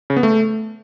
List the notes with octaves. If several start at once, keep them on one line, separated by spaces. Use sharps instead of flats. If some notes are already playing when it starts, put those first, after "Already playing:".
C#3
B3
A3